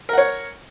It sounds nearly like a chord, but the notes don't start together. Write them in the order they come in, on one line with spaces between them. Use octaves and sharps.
A#4 F#5 C#5